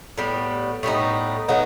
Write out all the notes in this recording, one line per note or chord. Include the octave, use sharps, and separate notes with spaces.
A2 G3 B3
A2 G3 B3 D#4
A2 F#3 B3 D#4